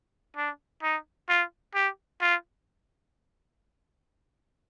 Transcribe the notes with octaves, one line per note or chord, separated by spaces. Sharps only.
D4
D#4
F4
G4
F4